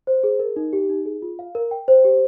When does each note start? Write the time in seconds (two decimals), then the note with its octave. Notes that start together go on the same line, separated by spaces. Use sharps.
0.07 C5
0.24 G#4
0.40 A#4
0.56 D#4
0.73 G4
0.90 D#4
1.06 G#4
1.22 F4
1.39 F5
1.55 A#4
1.71 G5
1.88 C5
2.05 G4